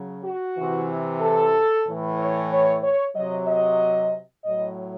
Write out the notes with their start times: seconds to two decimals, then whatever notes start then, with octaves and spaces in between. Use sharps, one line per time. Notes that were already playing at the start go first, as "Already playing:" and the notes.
Already playing: C#3 F#3
0.24 F#4
0.57 C3 E3
1.21 A4
1.86 A2 E3
2.19 C#5
2.52 C#5
2.84 C#5
3.16 C3 F#3 D#5
3.48 D#5
4.45 A2 F#3 D#5